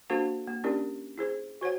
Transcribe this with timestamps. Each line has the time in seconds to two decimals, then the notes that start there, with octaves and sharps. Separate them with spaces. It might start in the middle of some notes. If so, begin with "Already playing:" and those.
0.10 A#3 D4 F#4 A4 C5 F5
0.47 A#3
0.64 C#4 D4 E4 G4 A#4 D5
1.18 E4 G#4 C5
1.61 F#4 C5 C#5 F#5